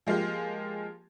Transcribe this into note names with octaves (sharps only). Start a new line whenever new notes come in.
F3 G#3 A#3 F4 G4